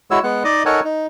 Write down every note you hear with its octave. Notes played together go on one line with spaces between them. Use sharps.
G#3 E4 F#4 C#5 E6
G#3 B3 F#5
D#4 D5 D#5
D#4 A4 A#4 C#5 F#5 G#5
D#4